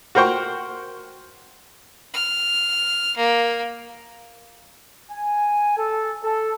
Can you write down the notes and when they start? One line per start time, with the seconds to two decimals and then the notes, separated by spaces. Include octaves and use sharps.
0.15 F#4 A#4 C5 G5 C#6
2.14 F6
3.17 A#3
5.10 G#5
5.77 A4
6.22 A4